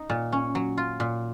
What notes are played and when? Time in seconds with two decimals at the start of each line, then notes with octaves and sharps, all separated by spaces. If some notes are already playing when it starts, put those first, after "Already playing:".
Already playing: D#4
0.10 A#2
0.32 C#4
0.55 F#3
0.77 F4
1.00 A#2